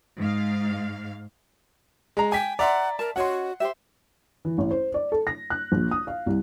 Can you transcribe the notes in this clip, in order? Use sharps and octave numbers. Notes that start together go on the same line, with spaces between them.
G#2 F5
G#3 A#5
G5 G#5 B6
D5 E5 F#5 A#5 C6
A#4 A5
C#4 F#4 C#5 D#5 F#5 C6
G4 C5 E5
E3
A1
C5
D5
A4
A#6
F#6
A#1
D#6
F5
C2